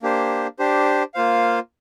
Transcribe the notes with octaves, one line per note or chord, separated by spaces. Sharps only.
A#3 D4 G4 C5
D4 G4 C5
A#3 F4 C5 F5